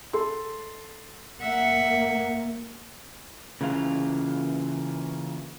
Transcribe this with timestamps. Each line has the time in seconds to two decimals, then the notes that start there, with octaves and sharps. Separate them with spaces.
0.13 A4 C6
1.42 A#3 E5 F#5
3.61 C#3 E3 A#3 F4